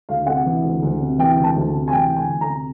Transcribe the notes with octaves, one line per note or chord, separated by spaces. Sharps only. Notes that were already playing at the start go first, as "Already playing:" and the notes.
D2 F5
C3 F#5
E3
D2
D2
C3
E3 G5
D2
A5
D2
C3
G#5
E3 G5
D2
G#5
D2
A#5
C3